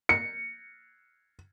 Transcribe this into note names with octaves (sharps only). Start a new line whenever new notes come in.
C#7